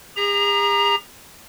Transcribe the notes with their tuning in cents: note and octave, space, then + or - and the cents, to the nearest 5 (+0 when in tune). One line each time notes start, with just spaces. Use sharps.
G#4 -45 A#5 +15